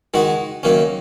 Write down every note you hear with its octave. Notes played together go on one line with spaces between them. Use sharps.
D#3 G#3 D#4 F#4
F#2 D#3 A#3 C#4